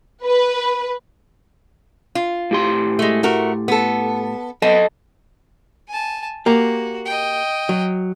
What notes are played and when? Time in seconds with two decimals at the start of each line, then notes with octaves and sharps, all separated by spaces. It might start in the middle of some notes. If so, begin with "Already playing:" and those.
0.24 B4
2.15 F4
2.51 A2 G4 C6
2.99 G#3 A3
3.23 A3 F#4 A#4
3.68 B3 A4
4.62 B3 A4 D#5 A5
5.88 G#5 A5
6.46 A#3 F#4 G4
7.05 D#5 G5
7.69 F#3